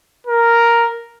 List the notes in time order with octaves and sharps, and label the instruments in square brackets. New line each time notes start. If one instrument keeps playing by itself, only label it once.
[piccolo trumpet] A#4